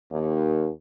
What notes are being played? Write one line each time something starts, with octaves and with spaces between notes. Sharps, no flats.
D#2